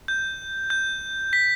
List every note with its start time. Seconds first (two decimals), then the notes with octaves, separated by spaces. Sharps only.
0.08 G6
0.70 G6
1.33 B6